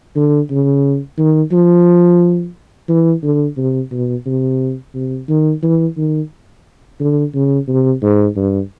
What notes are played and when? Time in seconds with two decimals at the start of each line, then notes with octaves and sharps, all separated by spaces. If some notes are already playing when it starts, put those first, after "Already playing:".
0.16 D3
0.51 C#3
1.19 D#3
1.52 F3
2.89 E3
3.23 D3
3.57 C3
3.92 B2
4.26 C3
4.95 C3
5.28 D#3
5.63 E3
5.97 D#3
7.00 D3
7.35 C#3
7.69 C3
8.03 G#2
8.36 G2